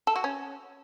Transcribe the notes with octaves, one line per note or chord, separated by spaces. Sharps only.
A4
F#4
C#4